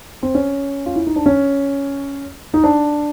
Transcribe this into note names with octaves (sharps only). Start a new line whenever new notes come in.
C4
C#4
F4
E4
D#4
D4
C#4
D#4
D4